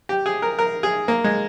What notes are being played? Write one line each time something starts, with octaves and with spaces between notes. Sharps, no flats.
G4
G#4
A#4
A#4
G#4
A#3
G#3